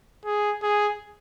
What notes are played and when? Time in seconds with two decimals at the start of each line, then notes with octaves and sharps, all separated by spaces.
0.26 G#4
0.62 G#4